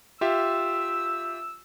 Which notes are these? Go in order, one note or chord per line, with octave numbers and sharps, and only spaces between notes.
F4 G4 E5 E6